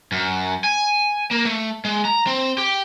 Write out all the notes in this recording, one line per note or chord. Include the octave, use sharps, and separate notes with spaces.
F#2
G#5
A#3
A3
G#3
A#5
C4
G4